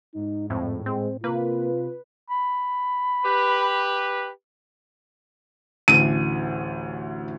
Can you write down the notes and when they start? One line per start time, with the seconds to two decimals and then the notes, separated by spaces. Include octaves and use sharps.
0.15 G#2 D#4
0.50 F2 A2 C4
0.86 G#3 C4
1.24 C3 A#3 F4 B4
2.30 B5
3.25 G4 B4
5.88 A1 D2 D#7